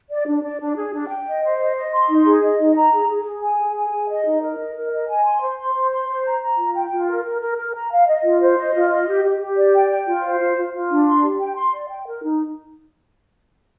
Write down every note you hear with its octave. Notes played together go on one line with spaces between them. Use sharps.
D5
D4
D5
D4
G#4
D4
G5
D#5
C5
D#5
D#5
C6
D#4
G#4
D#5
D#4
A#5
G#4
G#4
G#4
G#5
G#4
G#5
G#4
D#5
D#4
A#4
D#5
A#4
D#5
G#5
C6
C5
C6
C5
C6
C5
A#5
A#5
F4
G5
F4
A#4
A#4
A#4
A#4
A#5
F5
D#5
F4
C5
D#5
F4
D#5
G4
G4
G4
D5
G5
G5
F4
C5
F4
F4
F4
D4
C6
G4
G5
C6
D5
G5
A#4
D#4